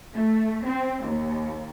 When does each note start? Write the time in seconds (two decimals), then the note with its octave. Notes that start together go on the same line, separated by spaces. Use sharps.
0.15 A3
0.66 C4
1.04 D#2